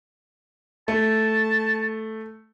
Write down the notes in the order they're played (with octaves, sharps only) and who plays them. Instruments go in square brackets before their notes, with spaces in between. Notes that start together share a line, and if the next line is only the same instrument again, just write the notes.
[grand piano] A3 [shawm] A5